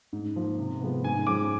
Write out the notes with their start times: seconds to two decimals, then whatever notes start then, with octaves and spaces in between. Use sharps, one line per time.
0.13 G#2
0.36 F3 A#3
0.59 C3
0.81 F3 G#3 B3
1.04 G#2 G#5
1.27 F3 G#3 C#4 D6